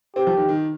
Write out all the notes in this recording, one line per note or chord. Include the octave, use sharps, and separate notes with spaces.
C4 G4
F3
D#3
D#3